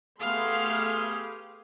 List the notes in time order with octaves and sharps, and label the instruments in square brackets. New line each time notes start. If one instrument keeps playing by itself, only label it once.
[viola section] A3 B3 C6 [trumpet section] G4 G#4 [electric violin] F5 F6